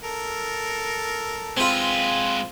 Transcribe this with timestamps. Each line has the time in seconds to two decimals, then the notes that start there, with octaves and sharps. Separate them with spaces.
0.03 A4 A#4
1.57 G#3 C4 F4 B4